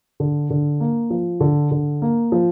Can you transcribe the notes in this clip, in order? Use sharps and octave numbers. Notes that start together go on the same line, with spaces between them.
D3
D3
A#3
F3
D3
D3
A#3
F3